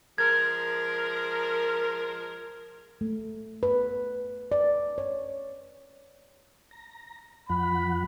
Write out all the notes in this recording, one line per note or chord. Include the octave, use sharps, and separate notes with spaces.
F3 G#3 A#4 G#6
A3
B4
D5
C#5
A#5
F2 F3 F#5 B5